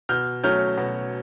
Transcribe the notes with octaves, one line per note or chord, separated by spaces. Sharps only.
B2 F6 G6
F#3 A3 C#4 F6 G6
B2